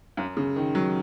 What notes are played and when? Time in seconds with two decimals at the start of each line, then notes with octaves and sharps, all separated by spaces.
0.17 F#2
0.37 C#3
0.56 D#3
0.75 F#3